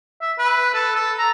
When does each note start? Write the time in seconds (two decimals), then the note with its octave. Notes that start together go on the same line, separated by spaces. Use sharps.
0.21 E5
0.39 B4
0.74 A4
0.95 A4
1.18 A#5